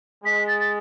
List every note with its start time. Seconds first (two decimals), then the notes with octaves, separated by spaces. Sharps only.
0.24 G#3 B6
0.48 A6
0.60 A6